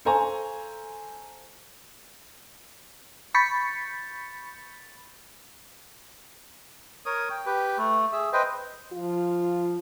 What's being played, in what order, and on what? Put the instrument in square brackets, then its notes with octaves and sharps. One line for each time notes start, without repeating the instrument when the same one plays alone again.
[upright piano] A4 C5 F5 G#5 A#5 C#6
[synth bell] B5 C#6 G6 A6 B6 C#7
[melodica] A#4 C#5 D#6
G5
G4 B4
A3
G#4 E5
B4 C5 D#5 G5
[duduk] F3 [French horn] F4